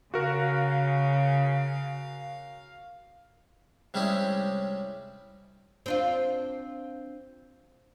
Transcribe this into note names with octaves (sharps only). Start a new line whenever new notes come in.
C#3 F#4 A#4 F5
C3 G3 G#3 C#4 E4 G4
C4 D4 F4